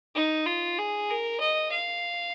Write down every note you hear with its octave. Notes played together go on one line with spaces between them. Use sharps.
D#4
F4
G#4
A#4
D#5
F5